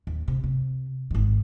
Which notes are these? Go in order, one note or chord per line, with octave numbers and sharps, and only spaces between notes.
D#2
C3
C3
G#1 D#3